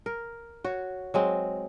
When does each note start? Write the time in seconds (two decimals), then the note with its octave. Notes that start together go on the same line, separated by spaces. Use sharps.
0.06 A#4
0.64 F#4 C#5
1.14 F#3 G#3 C4